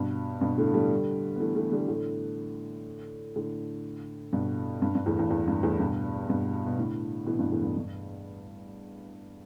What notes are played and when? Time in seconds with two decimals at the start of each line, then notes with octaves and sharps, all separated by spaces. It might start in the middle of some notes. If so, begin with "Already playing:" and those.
Already playing: G2 B2
0.41 G2 B2
0.58 A2 D3
0.74 D3 G3
1.36 B3
1.40 E3 A3
1.56 E3 A3
1.72 D3 G3
1.88 A2 D3
3.36 A2 D3
4.33 G2 B2
4.82 G2
4.95 G2
5.06 E2 A2
5.19 E2
5.31 E2
5.48 G2
5.63 E2 A2
5.80 G2 B2
6.29 G2 B2
6.67 B2
6.78 A2 D3
7.26 B2 E3
7.39 G2 B2
7.52 E2 A2
7.63 G2
7.77 G2